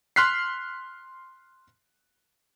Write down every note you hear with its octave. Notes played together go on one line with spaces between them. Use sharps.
C6 F6 F#6 B6 C7